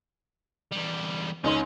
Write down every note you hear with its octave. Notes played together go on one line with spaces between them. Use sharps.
E2 G3
C#2 C#4 D#4 C6